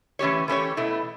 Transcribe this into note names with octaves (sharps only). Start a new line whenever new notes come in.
E3 A3 C#4 G4 C#5
E3 A3 C#4 G4 C#5
B2 A3 E4